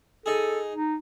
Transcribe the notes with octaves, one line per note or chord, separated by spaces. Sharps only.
D#4 G#4 A4
D#4